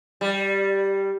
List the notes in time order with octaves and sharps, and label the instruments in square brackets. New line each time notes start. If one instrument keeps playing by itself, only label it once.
[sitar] G3